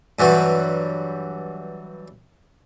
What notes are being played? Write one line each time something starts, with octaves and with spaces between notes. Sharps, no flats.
G2 E3 F#3 G3